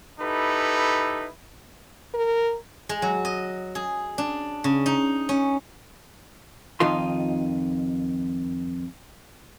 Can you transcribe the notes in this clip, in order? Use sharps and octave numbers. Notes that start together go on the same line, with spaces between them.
D#4 E4 G4 A4 B4
A#4
G#3
F#3
D#5
G#4
D4
C#3
D#4
C#4
F2 D#3 D#4 F4 C6